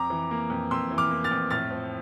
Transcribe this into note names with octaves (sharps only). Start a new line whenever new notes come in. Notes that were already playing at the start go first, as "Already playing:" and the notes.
Already playing: F2 A#5 D6
E3
A#3
F2
F2 C6 E6
E3
D6 F6
A#3
F6 A6
F2
A2 F6 A6
F3